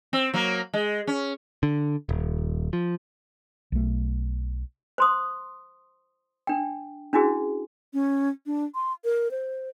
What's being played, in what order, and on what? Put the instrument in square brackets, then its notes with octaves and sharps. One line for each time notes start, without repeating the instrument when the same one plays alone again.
[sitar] C4
F#3 A#3
G#3
C#4
[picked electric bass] D3
D#1
F3
[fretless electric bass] B1 A3
[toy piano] C5 C6 D#6
D4 G5
C#4 D4 E4 F#4 G#4
[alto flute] C#4
D4
C6
A#4
C5